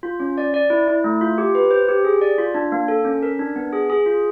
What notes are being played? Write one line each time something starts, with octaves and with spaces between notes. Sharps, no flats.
F4
C#4
D5
D5
E4
E4
A3
F4
G4
B4
C5
G4
G#4
D5
F4
D4
A#3
A4
C#4
A#4
D4
B3
G#4
G#4
F4